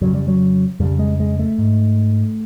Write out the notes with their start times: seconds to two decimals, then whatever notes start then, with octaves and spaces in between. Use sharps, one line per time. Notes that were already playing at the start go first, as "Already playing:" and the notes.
0.01 F2 C#3 F#3
0.14 G3
0.28 F#3
0.80 F2 C#3 G3
0.99 G#3
1.20 G#3
1.39 A3
1.58 G#2